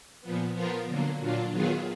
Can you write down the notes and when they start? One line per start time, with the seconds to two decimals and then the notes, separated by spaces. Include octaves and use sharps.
0.21 A#2 F3 B3
0.53 F3 B3 F4 A#4
0.86 D3 F#3 A#3
1.19 A#2 F#3 D4 F4
1.52 D#3 F#3 B3 F4 G#4